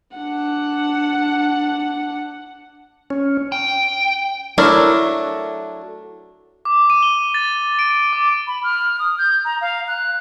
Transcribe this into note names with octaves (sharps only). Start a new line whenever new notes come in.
D4 F#5
C#4
G5
F#3 A3 D4 E4 A#4
D6
D#7
G7
A6
D7
D6
B5
F6
D#6
G6
A#5
F5
F#6